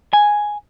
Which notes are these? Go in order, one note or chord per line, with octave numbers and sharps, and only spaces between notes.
G#5